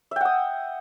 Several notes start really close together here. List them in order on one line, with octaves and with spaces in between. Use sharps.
E5 G5 F#5 D#6